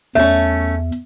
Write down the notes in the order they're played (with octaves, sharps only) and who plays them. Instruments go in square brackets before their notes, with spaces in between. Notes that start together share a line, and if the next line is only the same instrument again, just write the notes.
[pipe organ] E2 [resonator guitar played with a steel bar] A3 C#4 [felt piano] E5